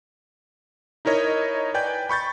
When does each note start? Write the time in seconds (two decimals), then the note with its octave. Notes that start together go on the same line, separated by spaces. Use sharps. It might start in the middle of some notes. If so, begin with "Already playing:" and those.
1.05 D#4 E4 A#4 C#5 D#5
1.74 B4 D5 G5 G#5 G6
2.09 B5 C#6 G6 A6